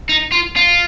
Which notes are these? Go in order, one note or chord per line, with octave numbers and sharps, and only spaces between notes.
D#4
F4
F4